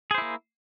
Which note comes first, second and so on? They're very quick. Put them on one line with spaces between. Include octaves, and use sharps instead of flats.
G#4 C5 E4 A#3